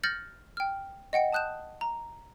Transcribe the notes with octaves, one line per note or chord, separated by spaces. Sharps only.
F6 G6 A6 A#6 C#7 F#7
G5 F6
D#5 F#5 G5 C#7
A5 D#6 F#6 G6 E7
A#5